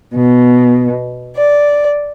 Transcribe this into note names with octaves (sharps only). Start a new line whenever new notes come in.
B2
D5